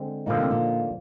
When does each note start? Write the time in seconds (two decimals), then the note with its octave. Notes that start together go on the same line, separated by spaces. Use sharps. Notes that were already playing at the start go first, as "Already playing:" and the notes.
Already playing: D3 G#3 C4
0.26 A#2 D3 F3 A#3 D#4
0.39 C3
0.50 A#2